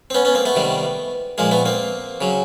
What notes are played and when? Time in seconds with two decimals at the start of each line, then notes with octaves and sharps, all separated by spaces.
0.10 C4
0.14 B3 C#4
0.25 B3 C#4
0.35 A#3 C4
0.45 A3 B3
0.55 C3 D#3 G3
1.38 A#2 F3 G#3 A#3
1.51 A3 B3
1.65 A#3 C4
2.21 C#3 F#3